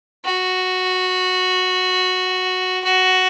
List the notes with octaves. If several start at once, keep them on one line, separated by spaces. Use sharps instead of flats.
F#4
F#4